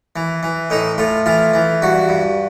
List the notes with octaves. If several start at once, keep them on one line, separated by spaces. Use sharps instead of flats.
E3
E3
A2 D#4
A2 F4
E3 F4
E3
G2 F#4
G2